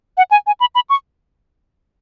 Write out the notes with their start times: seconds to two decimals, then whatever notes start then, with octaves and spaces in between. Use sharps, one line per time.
0.17 F#5
0.31 G#5
0.47 G#5
0.60 B5
0.75 B5
0.90 C#6